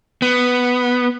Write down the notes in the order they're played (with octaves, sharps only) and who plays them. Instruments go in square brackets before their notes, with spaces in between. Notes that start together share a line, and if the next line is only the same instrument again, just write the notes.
[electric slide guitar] B3